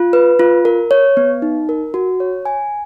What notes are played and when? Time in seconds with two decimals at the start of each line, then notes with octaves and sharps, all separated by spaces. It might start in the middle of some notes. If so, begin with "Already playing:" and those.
Already playing: F4
0.13 B4
0.39 F4
0.65 A#4
0.91 C#5
1.17 B3
1.42 D#4
1.69 A#4
1.94 F#4
2.20 C#5
2.45 G#5